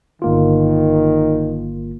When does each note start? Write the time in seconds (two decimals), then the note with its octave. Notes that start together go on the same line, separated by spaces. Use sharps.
0.22 G1 D#3 A#3 F4